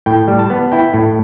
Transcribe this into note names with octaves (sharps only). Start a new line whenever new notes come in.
A2 G5
G3
A5
B3
E4 G5
A2